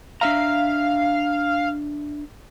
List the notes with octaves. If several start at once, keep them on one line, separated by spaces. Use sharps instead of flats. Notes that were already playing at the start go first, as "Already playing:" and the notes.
D4 E5 F5 A#5